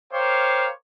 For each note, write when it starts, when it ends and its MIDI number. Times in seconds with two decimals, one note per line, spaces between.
0.13 0.69 70
0.13 0.69 72
0.13 0.69 73
0.13 0.69 77
0.13 0.69 79
0.13 0.69 86